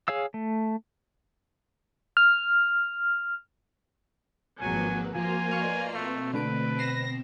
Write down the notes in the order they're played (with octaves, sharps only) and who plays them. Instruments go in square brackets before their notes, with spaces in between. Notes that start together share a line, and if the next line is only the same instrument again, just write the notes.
[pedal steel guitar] G#4 C#5 F5 E6
A3
[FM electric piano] F6
[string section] G#1 F#3 [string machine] F3 A#3 B4 [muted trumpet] G#5
[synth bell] F3 [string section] A#3 F4 [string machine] F#4 A#4 C5 [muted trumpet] G#5
[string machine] B4 D5 D#5 [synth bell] F5 C#6
[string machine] B2 C4 [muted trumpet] A3
[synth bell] D3 A3 D7 [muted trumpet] B4
[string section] A#6 [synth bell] C7 E7